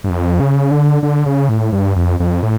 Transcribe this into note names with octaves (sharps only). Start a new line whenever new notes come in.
G2
F2
C#3
D3
D3
C#3
A2
G2
F2
F2
A2